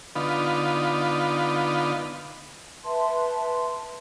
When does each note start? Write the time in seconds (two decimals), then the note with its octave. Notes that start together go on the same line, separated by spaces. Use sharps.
0.16 D3 B3 D#4 F4
2.85 B4 E5 A5 C6